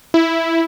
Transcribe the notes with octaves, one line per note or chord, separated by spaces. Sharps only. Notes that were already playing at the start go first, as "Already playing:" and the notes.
E4